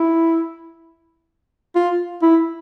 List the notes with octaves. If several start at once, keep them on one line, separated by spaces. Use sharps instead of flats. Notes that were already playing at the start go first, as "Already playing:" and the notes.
Already playing: E4
F4
E4